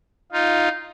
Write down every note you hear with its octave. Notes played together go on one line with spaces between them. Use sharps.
D#4 F4